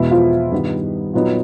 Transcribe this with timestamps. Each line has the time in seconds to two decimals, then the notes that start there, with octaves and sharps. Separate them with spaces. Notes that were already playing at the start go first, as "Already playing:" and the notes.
Already playing: E2 B2 G#3 B3 E4
0.11 F3 F4
0.52 G2 D#3 G3 B3
1.13 A#2 F#3 B3 D#4